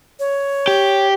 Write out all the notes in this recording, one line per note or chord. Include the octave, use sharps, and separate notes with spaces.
C#5
G4